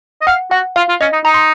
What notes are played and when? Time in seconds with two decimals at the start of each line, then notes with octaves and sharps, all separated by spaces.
0.21 D#5
0.27 F5 F#5
0.51 F#4 F#5
0.76 F4 F5
0.89 F4
1.01 C#4 D#5
1.13 D#4
1.25 D#4 A#5
1.34 C6